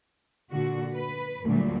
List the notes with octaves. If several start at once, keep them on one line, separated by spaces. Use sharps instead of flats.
A#2 D3 F#4
B4
D2 A#2 D3 F#3 G3 A3